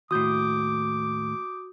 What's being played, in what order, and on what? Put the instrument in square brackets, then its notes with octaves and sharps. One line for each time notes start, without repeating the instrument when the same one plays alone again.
[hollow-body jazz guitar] D#2 A2 [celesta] F#4 [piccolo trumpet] D6 [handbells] D#6 G6